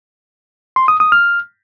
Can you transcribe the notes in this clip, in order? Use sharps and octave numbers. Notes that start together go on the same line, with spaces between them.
C6
D#6
D#6
F6